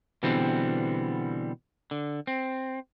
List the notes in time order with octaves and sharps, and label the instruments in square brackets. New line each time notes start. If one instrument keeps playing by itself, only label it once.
[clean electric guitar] B2 D3 E3 G3 B3 C4
D3
C4